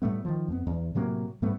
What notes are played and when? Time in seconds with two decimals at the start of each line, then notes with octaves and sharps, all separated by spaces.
0.02 A2 G3 A3 B3
0.25 D#3 F3
0.48 F2 A#3 B3
0.67 E2
0.95 A2 C3 F#3 A#3
1.42 G#2 G3 A3 B3